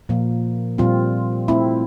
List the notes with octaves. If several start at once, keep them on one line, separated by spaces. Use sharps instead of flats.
A#2 F3 A#3
A#2 G3 C4 F4
A3 C4 E4